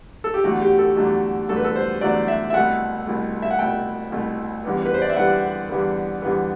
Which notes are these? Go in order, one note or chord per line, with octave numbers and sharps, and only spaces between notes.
A4
G4
E2 D3 F#3 A3 F#4
G4
A4
E2 D3 F#3 A3
E2 D3 F#3 A3 A4
B4
A4
C5
E2 D3 F#3 A3 D5
E5
E5
C2 B2 A3 F#5
C2 B2 A3
E5
F#5
C2 B2 A3 G5
C2 B2 A3
E2 D3 G3 B3
B4
C5
D5
E5
E2 D3 G3 B3 F#5
E2 D3 G3 B3
E2 D3 G3 B3